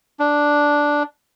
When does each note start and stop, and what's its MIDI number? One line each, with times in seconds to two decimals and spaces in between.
0.20 1.03 62